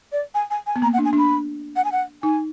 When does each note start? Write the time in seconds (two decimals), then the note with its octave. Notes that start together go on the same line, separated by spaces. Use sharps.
0.12 D5
0.35 G#5
0.50 G#5
0.67 G#5
0.76 B3
0.82 A#3 A#5
0.94 F#5
0.98 D4
1.05 G#5
1.13 D4
1.18 B5
1.76 F#5
1.85 G#5
1.92 F#5
2.23 D#4 G#5